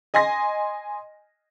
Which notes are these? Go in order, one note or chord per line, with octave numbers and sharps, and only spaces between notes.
D#5 G#5 C6 A#6